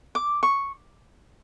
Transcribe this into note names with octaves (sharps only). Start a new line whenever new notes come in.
D6
C#6